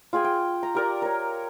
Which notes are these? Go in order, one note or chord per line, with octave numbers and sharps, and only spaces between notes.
F4 G#4 G5 G#5
G5
A#5
G4 A#4 D5
A#4 C#5